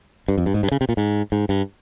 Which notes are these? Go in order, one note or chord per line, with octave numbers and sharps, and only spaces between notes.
G2
F2
G2
G#2
G2
C#3
C3
A#2
G#2
G#2
G2